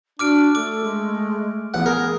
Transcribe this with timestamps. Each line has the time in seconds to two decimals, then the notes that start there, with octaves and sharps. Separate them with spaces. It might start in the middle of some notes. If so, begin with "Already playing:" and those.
0.19 D4 F#4 D6 F6 D7
0.55 A3 A4 D6
0.83 G#3
1.74 A1 B3 F#5
1.86 G#4 A#4